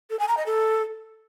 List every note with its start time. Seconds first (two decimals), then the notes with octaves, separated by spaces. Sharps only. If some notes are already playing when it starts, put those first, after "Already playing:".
0.10 A4
0.19 G#5
0.28 A#5
0.37 D#5
0.46 A4